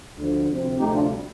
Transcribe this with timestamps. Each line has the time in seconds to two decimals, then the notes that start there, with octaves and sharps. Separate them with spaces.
0.17 D2 D3 F3
0.48 D2 C3 F3 C4
0.79 D2 C3 F3 A3 D#4 G4
0.94 D4 F4
1.10 G3